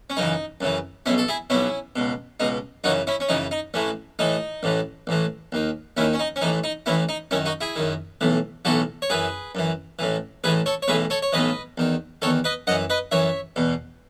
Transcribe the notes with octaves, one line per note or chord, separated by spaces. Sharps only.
C#4
F#2 C#3 E3 D#4
F#2 C#3 E3
B1 B2 C#4 E4
A4
E4 G#4
B1 B2 C#4 E4
C#2 B2
C#2 B2 D#4
F#2 C#3 E3 D#4 F#4
C#4 E4
C#4
F#2 C#3 E3 D#4
D#4
A1 A2 E3 C#4
A1 A2 E3 D#4
A1 A2 E3
A1 A2 E3
D#2 D#3
D#2 D#3 C#4 E4
C#4
D#4
C#4
A1 A2 E3 D#4
D#4
A1 A2 E3 C#4 E4
D#4
F#2 D#3 C#4 E4
D#4 F#4
E4 G#4
F#2 D#3
B1 A2 E3
B1 A2 E3 F#4 A4
C#5
F#2 E3 G#4 B4
F#2 E3
A1 A2 E3
A1 A2 E3 G#4 B4
A4 C#5
C#5
B1 A2 E3 G#4 B4
A4 C#5
C#5
B1 A2 E3 B4 D#5
E2 D#3
E2 D#3 A4 C#5
B4 D#5
F#2 E3 D#5 F#5
B4 D#5
F#2 E3 C#5 E5
E2 B2